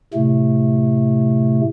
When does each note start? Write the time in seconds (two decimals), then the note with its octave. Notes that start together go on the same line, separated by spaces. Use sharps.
0.14 A2 C3 A3